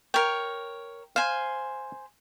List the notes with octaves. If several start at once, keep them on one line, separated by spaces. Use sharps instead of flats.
A#4 C#5 G5
C5 F5 G#5